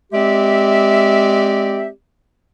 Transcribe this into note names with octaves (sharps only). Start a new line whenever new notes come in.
G#3 C4 G4 D5 E5